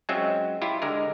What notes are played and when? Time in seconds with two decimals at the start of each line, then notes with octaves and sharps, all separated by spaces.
0.09 F#3 G#3 C4 C#4 F4 E5
0.62 E4 F4 G4
0.82 D3 G#3 A#4